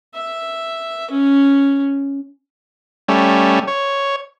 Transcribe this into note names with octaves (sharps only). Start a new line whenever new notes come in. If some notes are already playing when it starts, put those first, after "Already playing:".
E5
C#4
G3 A3 C#4
C#5